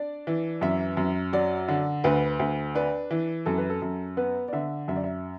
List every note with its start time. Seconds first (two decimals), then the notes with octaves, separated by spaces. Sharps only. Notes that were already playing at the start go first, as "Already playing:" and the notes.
Already playing: D4 D5
0.27 E3
0.61 F#2 E5
0.97 F#2
1.33 F#3 D5
1.69 D3
2.04 D2 B4
2.39 D2
2.75 D4 B4
3.11 E3
3.46 F#2 A4
3.58 B4
3.70 A4
3.82 F#2
4.17 B3 B4
4.48 D5
4.53 D3 E5
4.88 F#2 E5
4.96 D5
5.04 E5